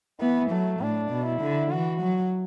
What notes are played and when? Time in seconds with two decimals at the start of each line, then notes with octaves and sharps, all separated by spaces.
0.20 E3 B3
0.51 F#3 A3
0.80 A2 D4
1.11 B2
1.26 E4
1.42 D3
1.71 E3 F#4
2.02 F#3